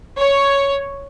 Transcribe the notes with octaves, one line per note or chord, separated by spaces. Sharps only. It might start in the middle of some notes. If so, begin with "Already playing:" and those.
C#5